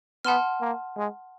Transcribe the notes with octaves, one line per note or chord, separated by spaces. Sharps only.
B3 F#5 A5 C6 F6
A#3
G#3